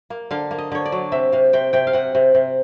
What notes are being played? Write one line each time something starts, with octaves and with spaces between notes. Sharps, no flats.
A#3
D3 F5
A#3
D#5
D3 C#5
D5
F#3
C3 E5
C3 F5
C3 G5
C3 G5
F5
C3 F#5
C3
C3